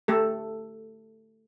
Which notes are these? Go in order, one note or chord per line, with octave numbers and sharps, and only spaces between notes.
A3 G4 A4